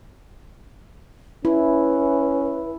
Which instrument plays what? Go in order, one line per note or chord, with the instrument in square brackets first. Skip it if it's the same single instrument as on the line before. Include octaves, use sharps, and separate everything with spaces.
[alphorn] C#4 [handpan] E4 [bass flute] B4